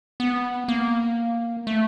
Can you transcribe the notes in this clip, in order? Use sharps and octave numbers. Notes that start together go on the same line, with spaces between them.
B3
A#3
A3